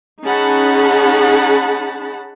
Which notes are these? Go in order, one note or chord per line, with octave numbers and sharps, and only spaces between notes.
C#4 D#4 G#4 F#5 A5 B5